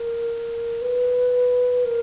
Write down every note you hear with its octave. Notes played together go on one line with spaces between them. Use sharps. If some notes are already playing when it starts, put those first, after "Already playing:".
Already playing: A#4
B4
A#4